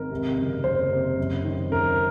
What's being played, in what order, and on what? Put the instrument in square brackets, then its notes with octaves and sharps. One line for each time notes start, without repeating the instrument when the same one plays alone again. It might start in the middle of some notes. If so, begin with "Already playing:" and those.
Already playing: [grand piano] G#1 A#4
C3
F#1
F#1 C5
C3
F#2
D#3
F#2 A#4